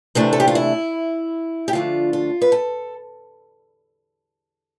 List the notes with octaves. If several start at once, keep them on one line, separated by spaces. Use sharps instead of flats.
C3 E3 A3 D4 C5
A4
G4
F4
E4
G4
D3 F3 A3 D4 F4
F4
B4
A4